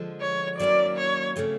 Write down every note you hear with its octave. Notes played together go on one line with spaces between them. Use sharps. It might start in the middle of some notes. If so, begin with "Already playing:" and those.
Already playing: D3 F3 G#3
C#5
D#3 F#3 A#3 C#4 E4 D5
C#5
C#3 F3 A3 C4